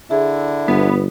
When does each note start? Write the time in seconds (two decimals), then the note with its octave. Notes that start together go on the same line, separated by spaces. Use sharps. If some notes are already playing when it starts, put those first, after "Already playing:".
0.10 D3 D4 E4 G#4 E5
0.68 G1 B3